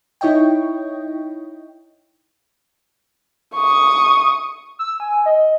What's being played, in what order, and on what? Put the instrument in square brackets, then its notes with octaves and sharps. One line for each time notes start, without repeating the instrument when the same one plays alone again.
[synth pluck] D#4 E4 C#5 D#5 G5
[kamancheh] C#6 D#6
[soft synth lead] E6
G#5
D#5